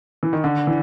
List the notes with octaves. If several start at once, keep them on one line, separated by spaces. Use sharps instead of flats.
E3
D#3
D3
E3